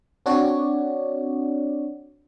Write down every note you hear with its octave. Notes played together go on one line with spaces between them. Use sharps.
C4 D4 F#4 C#5 D5